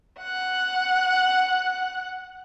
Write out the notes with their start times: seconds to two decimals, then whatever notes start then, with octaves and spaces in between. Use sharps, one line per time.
0.20 F#5 F#6